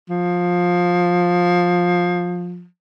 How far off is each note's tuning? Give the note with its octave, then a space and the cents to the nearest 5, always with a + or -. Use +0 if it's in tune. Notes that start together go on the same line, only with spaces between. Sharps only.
F3 +15